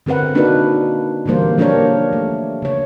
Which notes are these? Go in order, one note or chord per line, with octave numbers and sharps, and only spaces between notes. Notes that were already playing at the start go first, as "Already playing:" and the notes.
D3 C4 A#4 B4 F#5
A#3 D4 D#4 F#4 B4
D3 E3 G3 A#3 C5
F3 A#3 D4 G4 A#4 C#5
A3
C#3 C#5